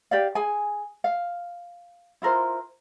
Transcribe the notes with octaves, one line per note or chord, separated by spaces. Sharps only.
G4 D5 F5
G#4 G#5
F5
E4 F4 A#4 C5